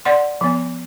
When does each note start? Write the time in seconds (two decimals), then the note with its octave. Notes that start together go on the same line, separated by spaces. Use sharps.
0.05 D5 F#5 C6
0.41 F3 B3